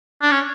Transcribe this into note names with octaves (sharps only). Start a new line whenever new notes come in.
D4
C#4